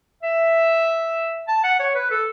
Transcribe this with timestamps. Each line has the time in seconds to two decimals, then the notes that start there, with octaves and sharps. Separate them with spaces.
0.23 E5
1.48 A5
1.64 F#5
1.80 C#5
1.95 B4
2.11 A4